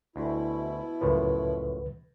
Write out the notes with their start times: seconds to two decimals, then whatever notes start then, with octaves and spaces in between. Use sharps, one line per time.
0.16 D2 B2 E4
1.01 C#2 F#2 A2 F3 B4